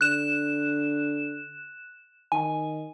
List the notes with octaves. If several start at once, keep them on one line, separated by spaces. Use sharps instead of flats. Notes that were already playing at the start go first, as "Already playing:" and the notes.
D3 F#6 E7
D#3 G#5